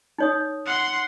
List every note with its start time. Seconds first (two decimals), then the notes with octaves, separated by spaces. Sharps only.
0.18 D#4 C#5 D#6
0.66 F#5 C6